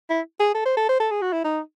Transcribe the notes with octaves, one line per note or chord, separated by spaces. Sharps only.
E4
G#4
A4
C5
A4
C5
A4
G#4
F#4
E4
D#4